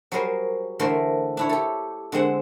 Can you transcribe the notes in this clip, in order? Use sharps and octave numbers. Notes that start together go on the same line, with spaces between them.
F#3 G3 G#4 A#4 C5
D3 E3 A3 A#4 C5 C6
D4 E4 C#5
G4 A4
D3 G#3 C4 F#5